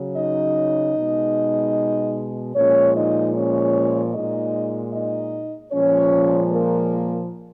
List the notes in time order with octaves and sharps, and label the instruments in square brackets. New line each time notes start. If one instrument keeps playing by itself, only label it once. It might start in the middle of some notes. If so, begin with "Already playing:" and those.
Already playing: [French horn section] C#3 F#3
D#4 D#5
B2 G#3
A#2 F3 G#3 C#4 C#5
D#4 D#5
C#4 C#5
A#2 G#3 D#4 D#5
D#4 D#5
A#2 F3 G#3 C#4 C#5
A#3 A#4